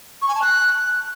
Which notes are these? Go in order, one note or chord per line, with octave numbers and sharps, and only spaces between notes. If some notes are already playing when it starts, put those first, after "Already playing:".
C#6
G#5
A5
F#6